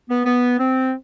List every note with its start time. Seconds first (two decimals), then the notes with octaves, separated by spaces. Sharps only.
0.09 B3
0.25 B3
0.59 C4